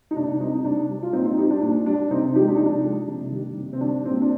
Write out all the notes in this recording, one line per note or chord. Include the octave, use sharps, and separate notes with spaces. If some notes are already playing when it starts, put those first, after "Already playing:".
D#4
C3 D4
G3 C4 D#4
D#4
C3 D4
G3
F4
A#2 C4 D#4
C4 D#4
G3 D#4 G4
D4
A#2 D4
G3 D4
C3 C4 D#4
F3 G#3 D#4 G4
D4
C3 D#4
D4
F3 G#3
C3
D#3 G3
C3
C4
D#3 G3 D4
A#2 C4
D4